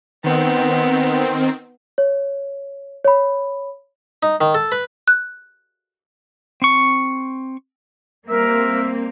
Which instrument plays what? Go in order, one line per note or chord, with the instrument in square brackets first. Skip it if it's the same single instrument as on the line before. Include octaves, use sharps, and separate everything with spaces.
[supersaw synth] D#3 C4 [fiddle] B3
[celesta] C#5
C#5 B5
[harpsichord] D#4
D#3
A4
B4
[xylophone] F#6
[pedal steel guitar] C4 C#6
[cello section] G3 A#3 C4 [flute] A#4 [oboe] E5